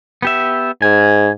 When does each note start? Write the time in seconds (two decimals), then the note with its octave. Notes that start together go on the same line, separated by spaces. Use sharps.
0.22 B3 G4 E5
0.82 G#2 G#5